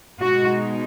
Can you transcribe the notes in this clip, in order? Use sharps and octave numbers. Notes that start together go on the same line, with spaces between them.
B2 G#3 D#4 F#4